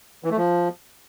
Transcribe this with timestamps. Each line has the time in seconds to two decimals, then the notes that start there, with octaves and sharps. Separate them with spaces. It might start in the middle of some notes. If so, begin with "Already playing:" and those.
0.24 E3
0.31 A3
0.37 F3